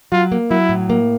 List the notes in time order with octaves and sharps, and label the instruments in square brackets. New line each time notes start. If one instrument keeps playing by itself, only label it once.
[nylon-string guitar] F#3 [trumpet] F4
[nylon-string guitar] A#3
[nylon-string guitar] F#3 [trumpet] E4
[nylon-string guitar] A2
A#3